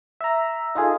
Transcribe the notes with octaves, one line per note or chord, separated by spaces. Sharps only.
E5 A#5
D#4 F4 G#4 A4